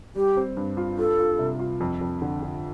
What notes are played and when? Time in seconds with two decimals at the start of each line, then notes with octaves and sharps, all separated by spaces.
0.15 G3 G4
0.37 C4
0.57 G2
0.77 F4
0.99 F4 A4
1.19 F4
1.39 C3
1.59 F4
1.80 F2
2.01 F2
2.22 D3
2.43 D3